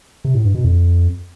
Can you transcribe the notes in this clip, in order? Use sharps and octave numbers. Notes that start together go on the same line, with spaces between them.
C3
A2
G2
B2
F2